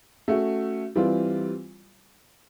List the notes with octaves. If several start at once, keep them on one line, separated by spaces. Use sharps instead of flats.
A3 C#4 F#4
E3 G3 C4 F4